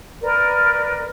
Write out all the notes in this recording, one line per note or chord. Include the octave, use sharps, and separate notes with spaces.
A#4 B4 D5